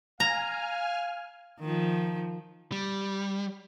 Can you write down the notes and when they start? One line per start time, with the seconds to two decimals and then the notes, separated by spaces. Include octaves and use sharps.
0.20 F5 G#5 A#5 F6
1.60 D#3 F3
2.72 G3